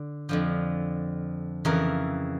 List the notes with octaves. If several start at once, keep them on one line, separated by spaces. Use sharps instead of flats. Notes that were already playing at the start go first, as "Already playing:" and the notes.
Already playing: D3
F2 D3 F3
F2 C#3 E3 A#4